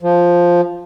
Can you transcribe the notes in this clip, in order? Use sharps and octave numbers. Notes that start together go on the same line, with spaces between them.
F3